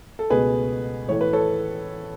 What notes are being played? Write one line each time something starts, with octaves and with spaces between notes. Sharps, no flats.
A4
C#2 B2 A3 G#4 B4
A2 E3 A3 C#5
B4
A4 C#5